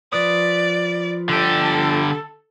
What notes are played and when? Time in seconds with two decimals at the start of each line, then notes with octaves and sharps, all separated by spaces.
0.13 F3 B4 D5 D#6
1.29 D3 G4 A4